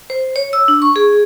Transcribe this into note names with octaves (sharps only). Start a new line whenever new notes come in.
C5
C#5
E6
D4
C#6
G#4